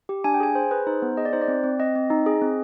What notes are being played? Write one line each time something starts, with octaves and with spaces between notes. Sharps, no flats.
G4
D4 G#5
G5
G#4 G#5
G#4 C5
G#4 B4
D#4 C5
B3
G#4 D#5
D5
D#4 C5
D5
C4
C4
C4 D#5
C4
D#4
G#4
C4